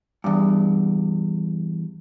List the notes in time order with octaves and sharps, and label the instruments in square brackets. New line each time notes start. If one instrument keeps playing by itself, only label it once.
[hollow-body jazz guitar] E2 G2